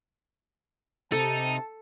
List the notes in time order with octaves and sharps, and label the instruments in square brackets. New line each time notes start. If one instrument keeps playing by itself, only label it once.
[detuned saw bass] C3 [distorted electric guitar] D#4 [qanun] A4 [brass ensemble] A5